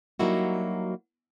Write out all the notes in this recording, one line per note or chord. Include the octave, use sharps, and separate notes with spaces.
F#3 G3 A#3 D#4 E4 F#4